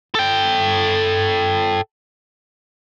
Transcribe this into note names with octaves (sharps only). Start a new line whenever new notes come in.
A4 G5